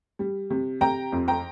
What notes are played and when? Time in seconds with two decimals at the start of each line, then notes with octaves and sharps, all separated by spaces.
0.19 G3
0.50 C3
0.81 C3 G5 A#5
1.13 F2
1.28 G5 A#5